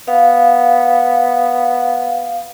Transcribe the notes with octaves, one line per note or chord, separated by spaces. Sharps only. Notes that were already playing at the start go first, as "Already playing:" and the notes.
B3 F5